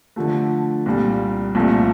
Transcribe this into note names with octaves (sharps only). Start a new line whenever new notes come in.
D3 F3 A3
C2 A#2 G3
C2 A#2 F3 A3